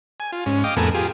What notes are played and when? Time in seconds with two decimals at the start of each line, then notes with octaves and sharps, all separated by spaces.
0.20 G#5
0.32 F4
0.46 G#2 C#4
0.64 D#5 F5 G5 D6
0.77 F2 A2 B3 A4 A#4 G#5
0.95 F4 G4 G#4